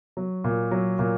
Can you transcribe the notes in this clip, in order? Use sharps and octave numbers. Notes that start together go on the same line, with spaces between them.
F#3
A#2
F#3
A#2